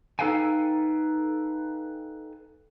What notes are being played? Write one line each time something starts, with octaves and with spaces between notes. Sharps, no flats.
D#4 A4 B4 F5 G5 G#5